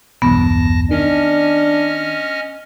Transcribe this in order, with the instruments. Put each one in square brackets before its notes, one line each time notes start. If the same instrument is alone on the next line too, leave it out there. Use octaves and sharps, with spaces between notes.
[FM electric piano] B1 E2 G2 [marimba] B3 [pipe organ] A5 A#6
[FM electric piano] D#3 [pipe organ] C#4 D#5 F6 [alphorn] D4